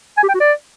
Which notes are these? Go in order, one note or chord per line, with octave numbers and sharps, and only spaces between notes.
G#5
G4
G5
F#4
D5